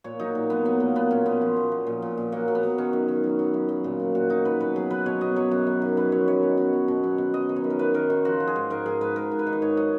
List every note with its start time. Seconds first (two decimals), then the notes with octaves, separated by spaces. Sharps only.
0.04 A#2 C#5
0.20 F#3 D#4
0.35 A#2
0.50 F#3 B3
0.65 F#3 B3
0.80 A#2 A#3
0.95 A#2 B3
1.11 A#2 C#4
1.26 A#2 B3
1.41 F3
1.56 A#2
1.72 F3
1.87 A#2
2.02 A#2
2.17 A#2
2.32 F#3 A#3
2.48 F#3
2.55 B3
2.63 F#3
2.78 D#3 C#4
2.93 F#2
3.08 D#3
3.24 F#3
3.39 F#3
3.54 F#2
3.69 F#3
3.84 A#2
4.00 F#3
4.15 A#2 F#4
4.30 F#3 D#4
4.45 F#3 B4
4.60 B2 B4
4.76 F#3 G#4
4.90 F#3 B4
5.06 B2 C#5
5.21 B2 D#5
5.36 F#3 C#5
5.51 F#2
5.66 D#3
5.82 F#2
5.97 F#2 B4
6.12 F#3 C#5
6.28 F#2 C#5
6.43 B2
6.57 F#3
6.73 F#3
6.88 B2
7.03 F#3
7.18 B2
7.34 F#3 D#5
7.49 D#3
7.56 C#5
7.64 F#2
7.70 A#4
7.79 F#2 B4
7.94 D#3 A#4
8.10 D#3 F#4
8.25 F3 F#4
8.40 F3
8.47 G#4
8.56 G#2
8.70 G#2 A#4
8.86 G#2 G#4
9.01 G#2 B4
9.16 G#2 A#4
9.31 G#2
9.39 B4
9.46 D#3
9.53 D#5
9.62 G#2 C#5
9.77 F#3 D#5